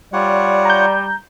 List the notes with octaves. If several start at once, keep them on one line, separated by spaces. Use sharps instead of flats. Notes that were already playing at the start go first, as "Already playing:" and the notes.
G3 F4 C#5 D5 F#5
A#5 G6